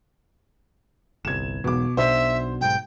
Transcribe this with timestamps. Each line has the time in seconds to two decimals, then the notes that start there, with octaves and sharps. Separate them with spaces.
1.25 G1 C2 G#6 E7
1.64 E1 B1 B2 D6
1.97 B1 B2 D4 C5 E5
2.61 B1 G#2 G5